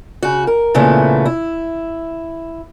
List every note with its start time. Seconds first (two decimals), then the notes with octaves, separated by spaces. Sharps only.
0.23 C#3 F#4
0.47 A#4
0.75 A#2 C#3 E3 A3 B3
1.26 E4